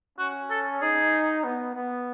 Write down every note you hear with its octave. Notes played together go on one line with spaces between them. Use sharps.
C#4 F#4
A4
D#4 G#4
B3
B3